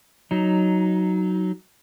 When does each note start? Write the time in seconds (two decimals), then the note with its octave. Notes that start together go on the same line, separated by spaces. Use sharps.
0.31 F#3 D#4